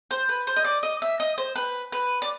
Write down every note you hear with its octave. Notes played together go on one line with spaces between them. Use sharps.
C5
B4
C5
D#5
D5
D#5
E5
D#5
C5
B4
B4
D5